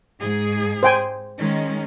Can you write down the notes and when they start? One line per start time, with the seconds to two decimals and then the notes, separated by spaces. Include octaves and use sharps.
0.20 G#2 G#4
0.83 C5 G5 G#5
1.38 D#3 G#3 C#4